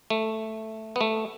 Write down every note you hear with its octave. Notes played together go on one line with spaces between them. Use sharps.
A3
B3
A3